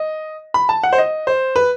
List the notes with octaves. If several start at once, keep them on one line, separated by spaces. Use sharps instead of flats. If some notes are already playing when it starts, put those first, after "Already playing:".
Already playing: D#5
B5
A5
F#5
C5
D#5
C5
B4